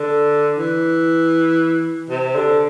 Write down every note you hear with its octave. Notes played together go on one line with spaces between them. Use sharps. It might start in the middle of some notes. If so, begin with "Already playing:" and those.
Already playing: D3
E3
C3
D3